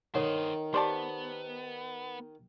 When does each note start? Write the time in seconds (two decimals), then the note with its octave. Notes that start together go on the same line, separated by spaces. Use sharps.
0.15 D#3 A4 C5 C#5 D#5 F#5
0.74 B3 G4 C5 D5 A5